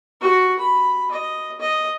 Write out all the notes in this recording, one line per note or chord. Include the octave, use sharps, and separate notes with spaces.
F#4
B5
D#5
D#5